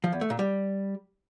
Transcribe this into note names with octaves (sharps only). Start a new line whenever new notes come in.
F3
E2
A3
A#2
G3